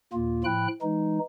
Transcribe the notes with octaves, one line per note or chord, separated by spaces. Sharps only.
D#2 A#2 A#3 F4
A2 F3 G5 B5 F#6
E3 G#3 D#4